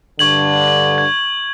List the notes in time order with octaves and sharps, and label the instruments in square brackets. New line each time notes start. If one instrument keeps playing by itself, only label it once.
[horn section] G2 D3 [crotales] C#6 G#6 F#7
[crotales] G#6